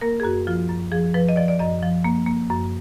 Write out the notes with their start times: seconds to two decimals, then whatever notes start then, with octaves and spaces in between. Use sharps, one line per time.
0.01 A#3 A#4
0.20 G#4
0.23 F#2 F#4
0.47 F3 F4
0.68 F#2
0.92 F3 G#4
1.14 F3 B4
1.29 D#5
1.36 F3 D5
1.48 D5
1.59 F#2 D#5
1.82 F3
2.04 A#3
2.26 A#3
2.50 F#2